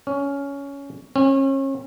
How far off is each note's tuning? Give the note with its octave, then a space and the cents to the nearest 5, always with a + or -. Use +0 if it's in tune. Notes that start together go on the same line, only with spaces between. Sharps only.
C#4 +15
C#4 -35